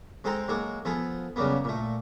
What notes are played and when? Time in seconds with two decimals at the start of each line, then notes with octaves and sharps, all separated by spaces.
0.24 G#3 C4 A4 C5 G5 A#5
0.48 F#3 G#3 A#3 A4
0.85 F3 B3 G#4 A4
1.36 C#3 F#3 G3 A#3 B3
1.64 A#2 A3